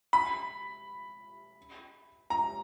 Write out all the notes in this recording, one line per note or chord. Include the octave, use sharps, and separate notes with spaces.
B5
A#5